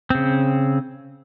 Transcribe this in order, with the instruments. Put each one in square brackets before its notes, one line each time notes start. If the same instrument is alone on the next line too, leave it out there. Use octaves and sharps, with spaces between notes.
[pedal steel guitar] C#3 C4